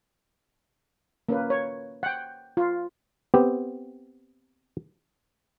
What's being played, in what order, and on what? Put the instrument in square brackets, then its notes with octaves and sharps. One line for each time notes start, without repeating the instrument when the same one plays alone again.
[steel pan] A#3 C#4 B4
C#5
F#5 G5
F4
[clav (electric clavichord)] B3 C4 G4